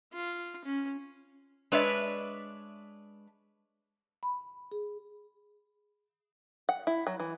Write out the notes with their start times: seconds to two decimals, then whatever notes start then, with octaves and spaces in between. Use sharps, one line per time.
0.13 F4
0.65 C#4
1.72 G#3 D4 B4 C#5 D5 E5
4.23 B5
4.72 G#4
6.69 F#5
6.87 E4
7.07 F#3
7.20 E3